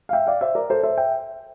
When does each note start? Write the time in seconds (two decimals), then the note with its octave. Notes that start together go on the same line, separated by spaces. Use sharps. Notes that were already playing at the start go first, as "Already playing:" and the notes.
0.09 F5
0.13 E5 G5
0.27 D5 F5
0.41 C5 E5
0.55 A#4 D5
0.70 A4 C5
0.83 C5 E5
0.97 E5 G5